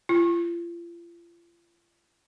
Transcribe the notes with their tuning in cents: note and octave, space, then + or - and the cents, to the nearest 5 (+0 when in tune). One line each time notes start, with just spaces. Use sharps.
F4 -40